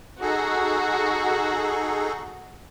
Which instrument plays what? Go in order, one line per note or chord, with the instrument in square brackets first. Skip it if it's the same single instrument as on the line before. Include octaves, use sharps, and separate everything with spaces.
[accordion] D#4 G#4 A4 [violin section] F#4